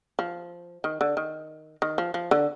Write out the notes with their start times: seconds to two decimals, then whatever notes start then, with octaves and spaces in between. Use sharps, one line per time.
0.19 F3
0.84 D#3
1.01 D3
1.17 D#3
1.82 D#3
1.98 F3
2.14 F3
2.31 D3